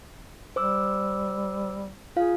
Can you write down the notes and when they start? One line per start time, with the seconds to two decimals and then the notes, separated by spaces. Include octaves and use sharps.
0.56 G3 C5 D6 E6
2.16 F4 G#4 F5